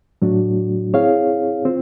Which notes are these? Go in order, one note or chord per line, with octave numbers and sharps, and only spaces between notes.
A2 F#3 A3 D4 F#4
C4 E4 G#4 C#5 F5
C4 F4